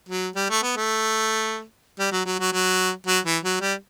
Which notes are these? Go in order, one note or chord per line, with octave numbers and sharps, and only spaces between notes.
F#3
G3
A3
B3
A3
G3
F#3
F#3
F#3
F#3
F#3
E3
F#3
G3